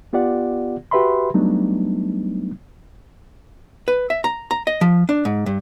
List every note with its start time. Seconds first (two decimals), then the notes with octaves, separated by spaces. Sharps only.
0.13 B3 F4 G4 D5 F#5
0.91 F#4 G4 B4 E5 B5 C6
1.34 F#3 G3 A3 B3 D4 D#4
3.88 B4
4.10 E5
4.24 A#5
4.51 A#5
4.67 D#5
4.81 F3
5.09 D4
5.25 G#2
5.46 G2